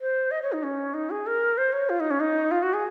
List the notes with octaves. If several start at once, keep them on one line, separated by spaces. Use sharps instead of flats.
C5
D#5
C#5
D#4
C#4
D#4
G#4
A#4
C5
C#5
F4
D#4
C#4
D#4
F4
F#4
G#4